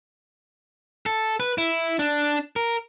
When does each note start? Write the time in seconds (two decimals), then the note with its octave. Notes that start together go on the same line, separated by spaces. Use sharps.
1.06 A4
1.40 B4
1.58 E4
1.99 D4
2.56 A#4